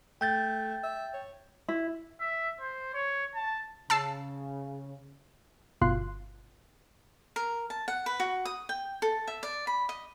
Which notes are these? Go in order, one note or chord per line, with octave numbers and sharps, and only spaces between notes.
A3 G5 G6 A6
E5
C#5
E4
E5
C5
C#5
A5
C#3 A5 E6 C7
G1 B2 F4 C6 F#6 C7
A#4
A5
F#5
B4
F#4
D#6
G5
A4
E5
D5
B5
D#5